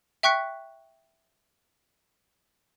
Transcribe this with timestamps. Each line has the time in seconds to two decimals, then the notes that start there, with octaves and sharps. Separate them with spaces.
0.23 E5 G5 C#6 F#6 B6 C#7